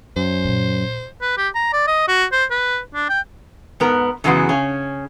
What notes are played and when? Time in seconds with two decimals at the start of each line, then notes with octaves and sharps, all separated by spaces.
0.17 F#2 C5
0.44 A#2 D3
1.22 B4
1.38 G4
1.55 A#5
1.73 D5
1.87 D#5
2.08 F#4
2.32 C5
2.51 B4
2.95 D4
3.09 G5
3.80 G#2 B3 A#4
4.24 F#2 C#3 E3 G#3 B3 F#4
4.49 C#3 C#4